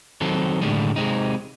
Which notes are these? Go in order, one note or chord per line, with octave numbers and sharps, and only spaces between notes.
D#3 F#3 C4 A4
A2 D3 D#3 G3 G#3
C3 G#3 C4 D#4